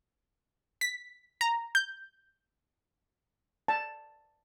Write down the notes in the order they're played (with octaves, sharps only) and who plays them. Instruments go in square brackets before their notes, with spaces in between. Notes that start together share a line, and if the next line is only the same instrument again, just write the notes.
[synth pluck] B6
A#5
G6
[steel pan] A5